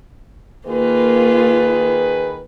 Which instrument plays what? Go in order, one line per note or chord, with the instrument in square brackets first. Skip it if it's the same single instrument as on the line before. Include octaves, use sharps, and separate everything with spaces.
[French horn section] D#3 G#4 B4 [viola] A#3 F4